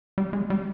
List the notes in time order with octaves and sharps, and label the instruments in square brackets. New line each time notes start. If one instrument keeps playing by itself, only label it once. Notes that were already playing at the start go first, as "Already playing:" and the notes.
[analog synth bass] G3
G#3
G3